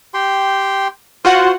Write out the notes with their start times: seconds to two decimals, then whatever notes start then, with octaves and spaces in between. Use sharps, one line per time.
0.14 G4 G5 C6
1.25 F4 F#4 C5 F#5 C6